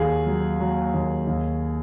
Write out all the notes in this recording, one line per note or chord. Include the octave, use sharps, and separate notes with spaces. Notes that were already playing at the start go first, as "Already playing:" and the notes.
Already playing: D#2 G#4
F#3
F#3
D#2
D#2